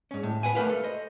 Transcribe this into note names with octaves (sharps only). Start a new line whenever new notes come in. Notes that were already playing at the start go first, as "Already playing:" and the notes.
G#2 C#4
A2
B4 F#5 G#5
A3 A#4 B4 F5
A4
C5 D#5